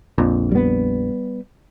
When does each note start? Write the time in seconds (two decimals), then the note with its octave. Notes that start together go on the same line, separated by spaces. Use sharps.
0.18 A#1 F2
0.51 G3 B3